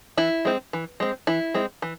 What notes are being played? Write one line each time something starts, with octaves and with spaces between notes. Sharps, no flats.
E3 E4
G#3 C4
E3
G#3 C4
E3 E4
G#3 C4
E3